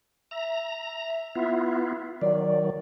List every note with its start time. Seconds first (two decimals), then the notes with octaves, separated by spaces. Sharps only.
0.31 E5 A#5
1.35 B3 E4 F4
2.21 D#3 F#3 D5